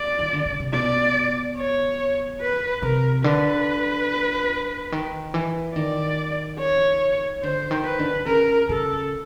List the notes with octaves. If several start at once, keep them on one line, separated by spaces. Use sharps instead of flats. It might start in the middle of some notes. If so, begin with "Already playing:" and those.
Already playing: D5
D#3
D3
C#3
C3
B2 D5
C#5
B4
C3 A#4
D3 B4
D#3
E3
D#3 D5
C#5
D3 C5
D#3
B4
D3
D3
C#3 A#4
C#3 A4